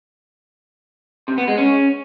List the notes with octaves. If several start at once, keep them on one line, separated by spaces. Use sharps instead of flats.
C3
B3
G#3
C#4